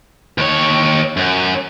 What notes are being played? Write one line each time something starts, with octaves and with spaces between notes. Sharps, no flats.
D#2 C#5
F#2